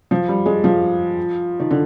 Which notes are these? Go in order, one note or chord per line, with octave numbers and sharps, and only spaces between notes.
F3
G3
G#3
F3
D#3
D3